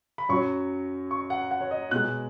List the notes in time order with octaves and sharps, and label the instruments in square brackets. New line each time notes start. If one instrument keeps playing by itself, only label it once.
[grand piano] B5
F#2 F#3 C#6
C#6
F#5
F#5
C#5
D#5
B2 G#3 F#6